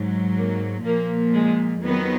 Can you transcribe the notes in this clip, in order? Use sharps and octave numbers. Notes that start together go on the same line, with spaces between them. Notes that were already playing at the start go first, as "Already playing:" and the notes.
Already playing: G#2 F#3
A#3
A#2 F3 A#3
G#3
F2 D#3 F#3 B3